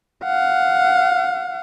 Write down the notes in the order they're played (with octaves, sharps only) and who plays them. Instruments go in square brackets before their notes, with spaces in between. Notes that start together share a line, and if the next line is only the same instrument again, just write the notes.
[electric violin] F5 F#5